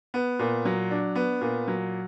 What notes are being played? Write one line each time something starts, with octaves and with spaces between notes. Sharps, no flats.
B3
A#2
F#3
D4
B3
A#2
F#3